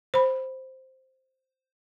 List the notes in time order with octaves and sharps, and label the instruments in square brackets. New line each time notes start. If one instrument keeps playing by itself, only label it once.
[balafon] C5 B5